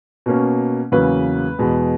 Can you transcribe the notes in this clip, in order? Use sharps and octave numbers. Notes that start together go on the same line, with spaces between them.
B2 A#3 C#4
E2 C#3 F#3 A#3 C#4 B4
E2 B2 G#3